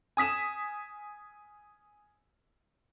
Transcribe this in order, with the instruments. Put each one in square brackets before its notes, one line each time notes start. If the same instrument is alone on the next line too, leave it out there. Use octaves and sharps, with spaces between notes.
[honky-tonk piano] G#5 D#6 B6 E7